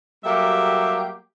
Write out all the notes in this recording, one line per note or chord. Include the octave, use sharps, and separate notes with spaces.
F#3 G3 A#3 G4 A4 E5